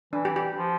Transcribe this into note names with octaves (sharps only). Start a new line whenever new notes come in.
E3 D4
G4
G4
F3